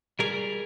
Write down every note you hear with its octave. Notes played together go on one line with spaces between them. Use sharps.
G3 G#4 A#4